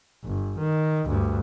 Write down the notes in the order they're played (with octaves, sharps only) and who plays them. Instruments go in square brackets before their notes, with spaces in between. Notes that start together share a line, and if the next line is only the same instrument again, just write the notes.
[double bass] G1
D#3
D2 G2